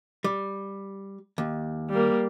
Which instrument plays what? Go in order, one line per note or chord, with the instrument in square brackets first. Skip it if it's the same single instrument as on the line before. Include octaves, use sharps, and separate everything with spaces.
[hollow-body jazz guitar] G3
D#2
[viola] G3 A#3